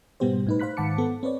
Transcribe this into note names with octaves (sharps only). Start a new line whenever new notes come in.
G#2 B2 G3 B3 G4 C5
A2 D#4 B4
C5 F5 B5 F#6 B6
G#2 D#3 F#5 A5 D6 C#7
B3 A4
C4 B4 C#5 D5